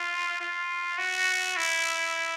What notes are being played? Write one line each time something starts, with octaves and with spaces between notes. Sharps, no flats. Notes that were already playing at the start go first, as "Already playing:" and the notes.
Already playing: F4
F4
F#4
E4